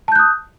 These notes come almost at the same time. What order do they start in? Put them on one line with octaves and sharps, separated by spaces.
A5 G6 F#6 D#6